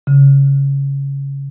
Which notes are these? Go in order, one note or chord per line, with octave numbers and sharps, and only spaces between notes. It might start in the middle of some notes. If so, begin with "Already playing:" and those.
C#3